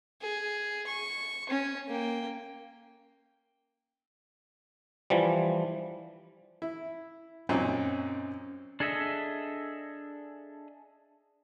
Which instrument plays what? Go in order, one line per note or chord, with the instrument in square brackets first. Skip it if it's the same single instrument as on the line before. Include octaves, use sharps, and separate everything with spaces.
[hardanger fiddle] G#4
C#6
C#4
A#3 G5
[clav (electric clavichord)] E3 F3 G3
[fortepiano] E4
F#2 A#2 C4 C#4 D#4
[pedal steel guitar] D4 G#4 A4 D#5 E5